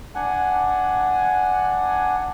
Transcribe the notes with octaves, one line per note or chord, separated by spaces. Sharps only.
D4 F#5 G#5